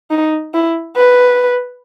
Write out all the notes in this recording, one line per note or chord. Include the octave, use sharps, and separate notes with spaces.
D#4
E4
B4